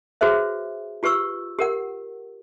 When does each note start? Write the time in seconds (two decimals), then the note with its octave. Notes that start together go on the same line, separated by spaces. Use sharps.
0.21 F#4 G#4 B4 C5 E5
1.03 F4 G4 B4 C#6 E6
1.59 G4 A#4 F#5